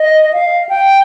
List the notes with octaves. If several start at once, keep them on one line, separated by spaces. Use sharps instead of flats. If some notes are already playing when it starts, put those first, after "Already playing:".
Already playing: D#5
F5
G5